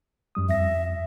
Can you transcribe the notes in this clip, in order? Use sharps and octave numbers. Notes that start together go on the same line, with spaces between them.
F#2 G3 D#6
F2 E5 A#6